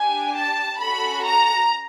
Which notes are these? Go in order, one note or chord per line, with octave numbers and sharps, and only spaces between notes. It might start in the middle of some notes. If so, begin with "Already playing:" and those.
Already playing: D4 G4 G#5
A5
C#4 F#4 A4 B5
A#5